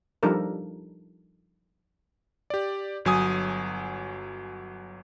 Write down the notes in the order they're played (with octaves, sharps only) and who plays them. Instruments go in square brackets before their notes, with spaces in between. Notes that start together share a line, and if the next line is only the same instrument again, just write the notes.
[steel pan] F3 G3 D4 D#4 A4 A#4
[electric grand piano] G4 D5
G1 F#3 G#5 D#6